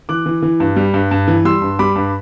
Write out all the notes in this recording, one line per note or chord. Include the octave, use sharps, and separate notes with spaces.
E3 D6 F#6
E3
E3
G2
G3
G2
G2
E3
G3 C6 E6
G2
G3 B5 D6
G2